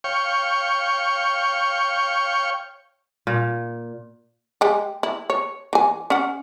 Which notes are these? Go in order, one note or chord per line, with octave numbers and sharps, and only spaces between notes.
C#5 F5 G5 C#6
A#2
G#3 G4
E4
C#5
E3 G#5
C#4 F#5